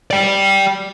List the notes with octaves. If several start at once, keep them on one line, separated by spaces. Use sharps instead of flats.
D5 G5